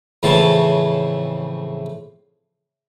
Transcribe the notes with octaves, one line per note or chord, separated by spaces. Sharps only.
F2 A2 C#3 E3 A5